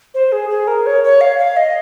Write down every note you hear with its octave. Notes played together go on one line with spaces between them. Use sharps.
C5
G#4
G#4
A#4
C#5
C#5
F5
F5
D#5